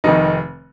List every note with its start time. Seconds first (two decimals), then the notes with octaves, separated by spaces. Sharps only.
0.04 F1 F2 D#3 D#4